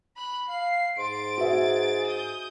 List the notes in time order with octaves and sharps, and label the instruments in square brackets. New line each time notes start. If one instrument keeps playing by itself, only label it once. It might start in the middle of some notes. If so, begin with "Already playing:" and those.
[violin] B5 F#6
[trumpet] F5 [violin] C7
[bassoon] G#2 [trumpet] C6 [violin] A6 D7
[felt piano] F#4 B4 E5 [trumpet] G#4
[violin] D#6 G6